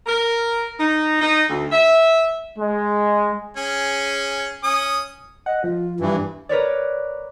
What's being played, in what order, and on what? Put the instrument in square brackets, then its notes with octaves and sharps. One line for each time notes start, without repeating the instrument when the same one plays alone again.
[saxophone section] A#4
D#4
D#4
D2
E5
[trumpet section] G#3
[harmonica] C#4 G#4
C#4 D#6
[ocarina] D#5 [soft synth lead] F#5
[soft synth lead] F3 [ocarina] F4
[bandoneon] G2 E3
[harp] A#4 B4 C#5 D5